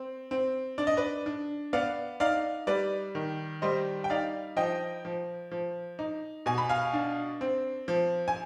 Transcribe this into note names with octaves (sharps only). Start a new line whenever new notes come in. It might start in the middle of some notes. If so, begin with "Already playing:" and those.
Already playing: C4
C4
D4 D5
D#5
B4 D5
D4
B3 D5 F5
D#4 D5 F5
G3 B4 D5
D#3
G3 C5 D#5
G5
D#4 D5 F5
F3 D#5 G5
F3
F3
D#4
B2 G#5
B5
F5 G#5
D4
C4
F3
G#5